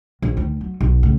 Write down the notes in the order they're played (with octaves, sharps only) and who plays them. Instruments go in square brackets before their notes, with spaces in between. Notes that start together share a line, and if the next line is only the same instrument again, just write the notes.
[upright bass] A#1
D2 D#3
F#3
B1
A2 C#3